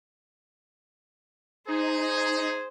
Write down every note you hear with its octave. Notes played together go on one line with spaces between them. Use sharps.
D#4 G#4 C5